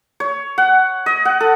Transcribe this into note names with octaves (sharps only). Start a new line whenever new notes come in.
C#5
F#5
D#5
F#5
A4